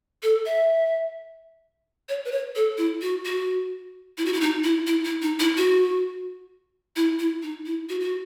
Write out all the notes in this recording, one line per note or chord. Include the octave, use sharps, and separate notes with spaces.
A4
E5
C#5
B4
C#5
A4
E4
F#4
F#4
E4
F#4
E4
D#4
E4
E4
E4
D#4
E4
F#4
E4
E4
D#4
E4
F#4
F#4